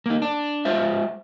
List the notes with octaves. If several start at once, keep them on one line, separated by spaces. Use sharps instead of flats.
A#3 D#4
D4
G#3 F4 C5 E5